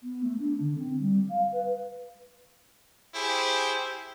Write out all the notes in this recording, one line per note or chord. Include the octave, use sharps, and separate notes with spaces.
B3
A3
D4
D3
C4
G3
F5
B4
E4 G4 G#4 C5